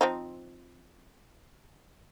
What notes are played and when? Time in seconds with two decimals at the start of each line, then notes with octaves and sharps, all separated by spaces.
0.01 F3 C4 D#4